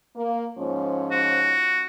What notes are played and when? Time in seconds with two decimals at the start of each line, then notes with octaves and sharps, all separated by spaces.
0.16 A#3
0.59 G#2 F3 C#4
1.11 F#4